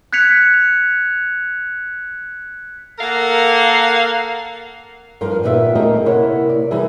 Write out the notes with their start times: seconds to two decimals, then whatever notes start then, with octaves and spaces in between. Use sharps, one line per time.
0.13 F#6 G#6 B6 C#7 F7
2.99 A#3 A4 A#4 F5 F#5
5.21 G2 F3 A#4 C5 F5
5.43 A#2 B3 E4 F4 G4 E5
5.75 A3 A#3 G4 G#4 A#4 D#5
6.05 C3 A#3 E4 A#4 C#5 F#5
6.49 D5
6.71 E3 G3 D#4 G#4 A#4 E5